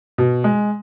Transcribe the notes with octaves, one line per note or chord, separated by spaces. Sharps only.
B2
G#3